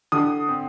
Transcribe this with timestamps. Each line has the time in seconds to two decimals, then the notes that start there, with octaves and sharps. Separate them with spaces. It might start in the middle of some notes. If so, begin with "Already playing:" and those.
0.12 D3 D#6
0.48 C4